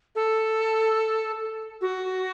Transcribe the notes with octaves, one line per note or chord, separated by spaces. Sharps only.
A4
F#4